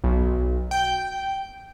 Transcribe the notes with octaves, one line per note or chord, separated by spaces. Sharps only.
B1
G5